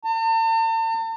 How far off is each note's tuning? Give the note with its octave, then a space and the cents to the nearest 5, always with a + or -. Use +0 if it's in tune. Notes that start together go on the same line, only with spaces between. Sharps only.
A5 +45